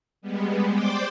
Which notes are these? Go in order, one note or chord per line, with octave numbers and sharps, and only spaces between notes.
G3 G#3 B3
C5 D5 G5 C6 D6